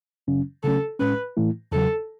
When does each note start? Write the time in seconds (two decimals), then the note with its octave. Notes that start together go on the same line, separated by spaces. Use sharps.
0.27 F#2 C#3 F#3 C#4
0.63 C#3 F#3 A3 C#4 A4
0.99 A2 G#3 C#4 B4
1.37 A2 E3 A3 E4
1.72 E2 C#3 F#3 A4